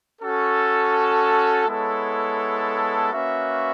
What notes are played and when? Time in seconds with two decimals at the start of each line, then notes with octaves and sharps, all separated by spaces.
0.22 C#4 F#4 A4
1.68 G#3 B3 E4 A4 C#5
3.13 A#3 C#4 F#4 B4 E5